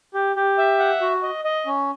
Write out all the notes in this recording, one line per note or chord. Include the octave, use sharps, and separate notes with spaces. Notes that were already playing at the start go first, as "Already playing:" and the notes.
G4
G4
E5
F#5
F#4
D#5
D#5
C#4